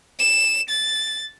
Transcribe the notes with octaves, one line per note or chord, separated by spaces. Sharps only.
E7
A6